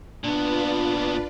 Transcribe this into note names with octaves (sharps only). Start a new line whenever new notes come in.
A#2 B3 D4 F4 B4 D5